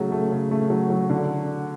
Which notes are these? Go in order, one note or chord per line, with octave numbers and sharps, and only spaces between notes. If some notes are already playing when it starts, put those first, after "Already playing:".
Already playing: C#3 F#3 A3
A3
C#3
A3
F#3
F#3
D3